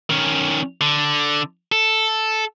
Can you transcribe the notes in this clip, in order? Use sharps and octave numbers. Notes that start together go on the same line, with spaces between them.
D#3 C#4
D3
A4